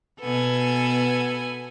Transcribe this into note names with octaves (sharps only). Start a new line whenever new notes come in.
B2 B3 A4 G#5